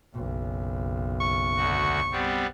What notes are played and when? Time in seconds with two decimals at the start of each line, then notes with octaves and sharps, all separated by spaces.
0.14 F#1 B1
1.21 C#6
1.57 D2 F#4
2.12 G3 B3 C4